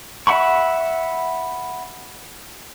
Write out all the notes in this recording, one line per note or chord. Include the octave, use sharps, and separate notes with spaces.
E5 F#5 B5 C#6